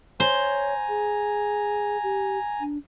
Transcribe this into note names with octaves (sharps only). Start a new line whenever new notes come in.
C5 C#5 G#5 A#5
G#4
G4
D4